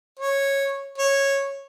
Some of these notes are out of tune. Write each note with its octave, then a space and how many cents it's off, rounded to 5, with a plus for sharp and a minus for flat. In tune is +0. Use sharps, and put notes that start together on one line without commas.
C#5 -10
C#5 -10